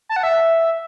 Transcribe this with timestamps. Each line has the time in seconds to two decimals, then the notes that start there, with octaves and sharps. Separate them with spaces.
0.09 A5
0.16 F#5
0.23 E5